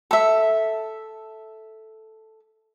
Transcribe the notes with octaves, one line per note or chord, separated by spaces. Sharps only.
A4 E5